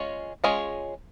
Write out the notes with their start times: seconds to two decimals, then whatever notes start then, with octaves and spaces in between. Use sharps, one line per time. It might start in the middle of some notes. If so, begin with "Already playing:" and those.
Already playing: G#3 C#4 F4 C#5
0.44 G#3 C#4 F4 G#4 C#5